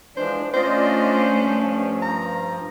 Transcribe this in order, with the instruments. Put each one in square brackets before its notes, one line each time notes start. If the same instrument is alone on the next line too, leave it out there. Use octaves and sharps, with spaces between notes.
[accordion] E3 F3 G#3 [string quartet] D4 [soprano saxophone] C5
[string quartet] A3 C#4 D4 [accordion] F4 D5 D#5 [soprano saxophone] C5
[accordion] G2 F3
[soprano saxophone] A#5